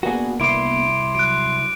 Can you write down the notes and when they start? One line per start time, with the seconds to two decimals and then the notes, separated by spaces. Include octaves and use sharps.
0.03 A#3 B3 D4 F#4 G#4
0.40 C2 E4 C6 D6 D7
1.15 F#3 F#6 D7